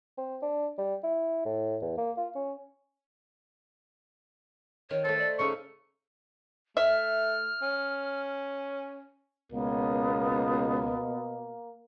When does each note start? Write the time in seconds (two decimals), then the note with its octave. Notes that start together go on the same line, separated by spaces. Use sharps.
0.17 C4
0.42 D4
0.78 G3
1.03 E4
1.45 A2
1.81 E2
1.97 A#3
2.17 F4
2.35 C#4
4.90 D#3 C#5
5.04 A3 A4 C5
5.18 D5
5.39 C#3 D#4 A4 C#6
6.77 A3 E5 F6
7.62 C#4
9.52 C#2 B2 A#3 B3